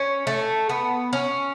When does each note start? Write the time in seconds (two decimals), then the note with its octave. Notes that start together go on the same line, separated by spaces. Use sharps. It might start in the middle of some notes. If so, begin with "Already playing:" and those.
Already playing: C#4
0.27 A3
0.69 B3
1.13 C#4